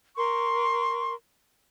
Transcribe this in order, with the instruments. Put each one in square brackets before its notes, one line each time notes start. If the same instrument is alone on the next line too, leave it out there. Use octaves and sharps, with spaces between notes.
[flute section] A#4 C6 C#6